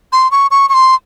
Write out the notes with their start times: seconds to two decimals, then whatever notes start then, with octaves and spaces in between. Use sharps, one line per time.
0.13 C6
0.32 C#6
0.51 C#6
0.69 C#6
0.74 C6